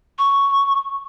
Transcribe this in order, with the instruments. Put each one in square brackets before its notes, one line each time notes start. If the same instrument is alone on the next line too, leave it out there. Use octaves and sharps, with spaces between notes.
[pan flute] C#6